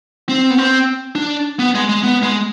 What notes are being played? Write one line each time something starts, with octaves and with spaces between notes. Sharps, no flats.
C4
B3
C4
D4
B3
G#3
G#3
B3
G#3